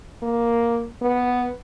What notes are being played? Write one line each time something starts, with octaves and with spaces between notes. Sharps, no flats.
A#3
B3